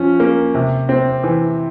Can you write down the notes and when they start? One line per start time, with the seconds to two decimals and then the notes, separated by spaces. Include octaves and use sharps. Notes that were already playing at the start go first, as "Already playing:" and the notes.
Already playing: F3 C#4
0.20 A#3
0.54 C3
0.89 C4
1.23 E3